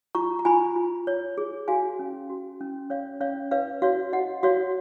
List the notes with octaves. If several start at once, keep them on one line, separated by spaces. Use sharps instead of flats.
F4 A#5 C#6
A#5
F4 G#5 B5
F4
C#5
G#4
F#4 F5 G#5
C#4
F#4
C#4
C#4 C#5 F5
C#4 C#5 F5
B4 C#5 F5
F#4 C#5 F5
F#4 D#5 F#5
F#4 C#5 F5